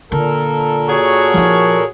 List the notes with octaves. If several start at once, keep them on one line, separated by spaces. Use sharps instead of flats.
A#2 D3 A4 A#4
F#4 G#4 C#5
F3 E4